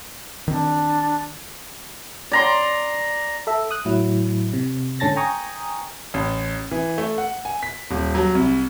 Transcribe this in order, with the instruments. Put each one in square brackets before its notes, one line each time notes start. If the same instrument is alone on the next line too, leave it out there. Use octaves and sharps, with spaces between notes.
[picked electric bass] D#3 C4 [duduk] D4
[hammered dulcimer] D5 A#5 C6
[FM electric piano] A4 E5
D#6 F#6
A2 F#3 E4
C3
G#2 D3 C#4 A5 A6 A#6
G5 G#5 A#5 C#6 D#6
[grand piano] A1
E3
A3
F#5
G#5
B6
D#1
F#3
C2